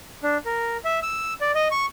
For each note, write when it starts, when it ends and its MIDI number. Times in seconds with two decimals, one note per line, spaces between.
0.23 0.38 62
0.45 0.77 70
0.85 0.99 76
1.03 1.33 88
1.41 1.52 74
1.55 1.68 75
1.71 1.86 85